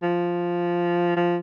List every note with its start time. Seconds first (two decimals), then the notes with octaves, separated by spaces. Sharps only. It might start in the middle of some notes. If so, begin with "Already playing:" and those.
0.03 F3
1.17 F3